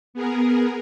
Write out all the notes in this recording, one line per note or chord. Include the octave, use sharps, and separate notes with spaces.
B3 G#4 A#4